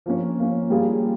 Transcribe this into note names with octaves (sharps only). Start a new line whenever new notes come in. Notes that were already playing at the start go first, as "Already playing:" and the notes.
F3 A#3 C#4
F3 A#3 C#4
G3 A#3 F4 G#4